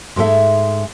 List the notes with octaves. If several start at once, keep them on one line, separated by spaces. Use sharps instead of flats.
G#2 G#3 A3 C#4 A4 E5